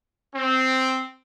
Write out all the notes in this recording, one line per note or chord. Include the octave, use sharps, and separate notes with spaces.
C4